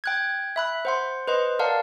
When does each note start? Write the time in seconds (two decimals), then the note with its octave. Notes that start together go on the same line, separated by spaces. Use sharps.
0.04 G5 F#6 G#6
0.56 E5 B5 F#6
0.85 C5 F#5 C6
1.27 B4 C5 D#5 C6
1.59 A#4 D5 F5 F#5 A5